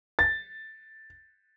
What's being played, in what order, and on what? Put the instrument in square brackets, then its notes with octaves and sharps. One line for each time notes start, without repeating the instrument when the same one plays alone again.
[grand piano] A6